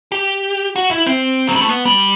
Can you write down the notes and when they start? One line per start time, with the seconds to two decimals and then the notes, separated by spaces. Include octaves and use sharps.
0.12 G4
0.76 F#4
0.91 E4
1.07 C4
1.48 F#3
1.55 G3
1.62 A3
1.69 B3
1.85 G3